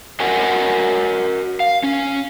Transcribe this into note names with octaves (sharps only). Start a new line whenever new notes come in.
F#4 A#4 D#5 F#5 G#5
F5
C#4